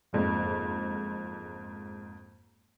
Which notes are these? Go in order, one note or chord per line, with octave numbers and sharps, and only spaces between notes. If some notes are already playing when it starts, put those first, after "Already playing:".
F#1 F2 G#2